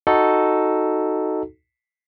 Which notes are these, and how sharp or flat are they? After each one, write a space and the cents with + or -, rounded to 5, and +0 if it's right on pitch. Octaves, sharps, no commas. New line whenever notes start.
D#4 +0 F#4 +0 A4 +0